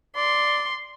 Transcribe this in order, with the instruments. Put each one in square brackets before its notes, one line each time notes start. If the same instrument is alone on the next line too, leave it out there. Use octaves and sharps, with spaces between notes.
[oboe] D5 [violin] C6